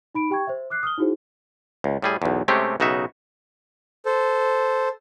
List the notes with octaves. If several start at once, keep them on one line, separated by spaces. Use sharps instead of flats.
D#4 B5 D7
G4 G5 C#6 G#6
C5 E5
D6 F6 F#6 C7
D#6 F6 G7
D#4 E4 F#4 G#4 C5
C#2
A2 G3 G#4
B1 E2
C3 G#3 A3 C4 C#4 G4
B1 C#3 D#4 F#4 E5
A4 C5